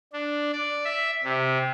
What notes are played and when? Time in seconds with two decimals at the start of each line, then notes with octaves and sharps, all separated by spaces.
0.13 D4
0.52 D5
0.85 E5
1.24 C3